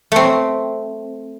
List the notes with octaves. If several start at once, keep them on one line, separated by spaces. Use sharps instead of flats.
A3 C4